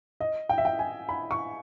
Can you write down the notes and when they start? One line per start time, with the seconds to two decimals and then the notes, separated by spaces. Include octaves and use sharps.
0.20 D#5
0.49 G5
0.58 E5
0.65 G5
0.79 G#5
1.09 B5
1.31 C#6